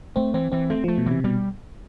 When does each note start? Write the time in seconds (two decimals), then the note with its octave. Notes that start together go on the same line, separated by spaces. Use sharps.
0.16 A3 C4
0.34 E3 C4
0.52 E3 C4
0.70 A3 C4
0.84 F3 A3
0.98 B2
1.06 C3 E3
1.24 B2 G3